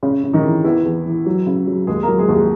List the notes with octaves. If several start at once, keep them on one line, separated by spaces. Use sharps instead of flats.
C#3 C#4
C#3
D#3 D#4
E3
E2 E3 E4
E2
E3
F#3
C#3
F#3
D#2 G#3 G#4
A#3 A#4
F#3
G#3 G#4
D#2
G#3 G#4